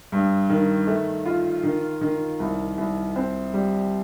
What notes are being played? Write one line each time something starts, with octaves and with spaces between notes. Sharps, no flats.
G2
D#3
A3
F4
D#3
D#3
C2
C2
C4
G3